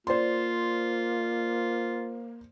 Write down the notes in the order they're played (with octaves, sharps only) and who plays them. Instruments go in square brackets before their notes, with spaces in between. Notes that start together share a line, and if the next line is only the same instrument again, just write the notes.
[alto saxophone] A#3 [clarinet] F4 [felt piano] C5 D5 C6